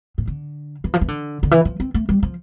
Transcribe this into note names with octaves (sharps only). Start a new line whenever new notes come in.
A2
D3
E3
F3
E3
D3
D3
E3
F3
C4
A3
G3
F3